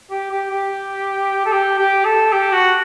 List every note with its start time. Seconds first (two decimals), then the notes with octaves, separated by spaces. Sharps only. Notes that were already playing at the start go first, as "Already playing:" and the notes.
0.11 G4
0.31 G4
0.51 G4
1.45 A4
1.52 G4
1.78 G4
2.05 A4
2.32 G4
2.52 F#4